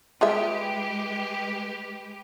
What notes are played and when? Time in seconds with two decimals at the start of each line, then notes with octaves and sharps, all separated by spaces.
0.21 G#3 F4 G4 G#4 B4 E5